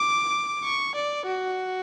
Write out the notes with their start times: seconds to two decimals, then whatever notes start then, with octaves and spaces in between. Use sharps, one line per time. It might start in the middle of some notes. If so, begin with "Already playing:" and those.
Already playing: D6
0.64 C#6
0.95 D5
1.27 F#4